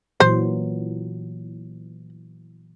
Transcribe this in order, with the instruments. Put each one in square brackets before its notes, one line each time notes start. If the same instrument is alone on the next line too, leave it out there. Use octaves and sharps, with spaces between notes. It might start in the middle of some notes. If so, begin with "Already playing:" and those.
[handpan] A#2 E3 F#3 [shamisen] C5